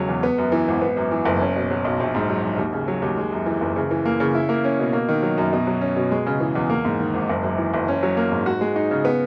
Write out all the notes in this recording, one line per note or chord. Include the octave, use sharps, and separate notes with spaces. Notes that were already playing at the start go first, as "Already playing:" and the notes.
Already playing: E1 C#3 F#3
E2
B3
F#2
E3
G#1
B3
F#2
E3
F#1
C#4
B2
F#3
B1
A#1
G#2
F#3
A#1
D#2
C#3
F#3
D#2
G#3
F#2
E3
F#1
C#3
E3
A#3
C#3
E4
A#3
C#4
B2
A#3
D#3
F#3
F#2
B2
F#3
C#4
B2
G#3
C#3
E3
E2
A#3
G#2
D#3
G#1
F#1
F#2
E3
F#1
C#4
F#3
A#3
G#2
F#4
G#3
D#4
C#3
B3